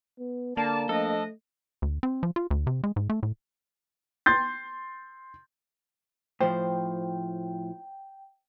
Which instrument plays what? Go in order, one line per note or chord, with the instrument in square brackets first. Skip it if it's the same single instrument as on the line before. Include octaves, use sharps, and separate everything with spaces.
[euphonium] B3
[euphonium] D3 [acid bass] A#3 [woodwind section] D5 A5
[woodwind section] F3 D4 D#5 [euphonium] A3 [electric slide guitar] A4
[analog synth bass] D2
C4
F3
F4
D2
C3
G#3
G#2
A3
A2
[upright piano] C6 G6 A6
[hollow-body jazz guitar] A2 F3 [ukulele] C5 [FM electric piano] G5